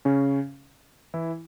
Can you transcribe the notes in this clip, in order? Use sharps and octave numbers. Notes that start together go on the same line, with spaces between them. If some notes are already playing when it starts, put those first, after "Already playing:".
C#3 C#4
E3 E4